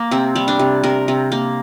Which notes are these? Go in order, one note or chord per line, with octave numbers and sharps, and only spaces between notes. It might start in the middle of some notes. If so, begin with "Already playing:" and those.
Already playing: A#3
C3 C4
G3
D4
C3
C3 A#4
C3
A#3